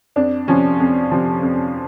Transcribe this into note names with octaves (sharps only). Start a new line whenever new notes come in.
F2 D4
C3 F3 C#4
F2
C3 F3
F2